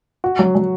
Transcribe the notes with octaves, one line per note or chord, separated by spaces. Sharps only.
F#4
F#3
F#3